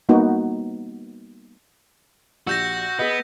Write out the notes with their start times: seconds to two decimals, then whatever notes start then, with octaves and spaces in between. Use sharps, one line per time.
0.09 G3 A#3 B3 D#4 F#4 B4
2.47 A#1 F#4 G4 E6 G6 A#6 E7
2.99 B3 G#4 D#5